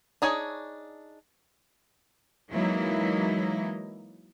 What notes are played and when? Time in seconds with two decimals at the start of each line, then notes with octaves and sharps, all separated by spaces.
0.22 D4 D#4 G#4 C#5
2.50 E3 F#3 G#3 A#3 D#4 E4